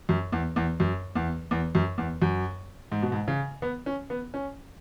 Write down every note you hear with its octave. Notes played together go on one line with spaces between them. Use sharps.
F#2
E2
E2
F#2
E2
E2
F#2
E2
F#2
G#2
B2
G#2
C#3
B3
C#4
B3
C#4